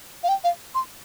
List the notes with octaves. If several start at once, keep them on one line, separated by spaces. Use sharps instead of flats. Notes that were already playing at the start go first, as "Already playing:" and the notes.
F5
G5
F5
C6